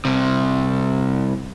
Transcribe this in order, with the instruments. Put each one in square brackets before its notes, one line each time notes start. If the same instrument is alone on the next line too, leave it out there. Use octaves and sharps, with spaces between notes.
[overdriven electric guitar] C2 C3